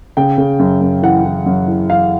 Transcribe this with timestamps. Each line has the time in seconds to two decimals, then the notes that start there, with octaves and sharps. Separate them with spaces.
0.17 C#3 G5
0.38 C#3
0.59 F#2
0.81 F#2
1.03 E3 F#5
1.25 E3
1.46 F#2
1.68 E3
1.90 E3 F5